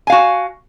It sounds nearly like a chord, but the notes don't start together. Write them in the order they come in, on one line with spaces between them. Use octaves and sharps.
G#5 F5 F#4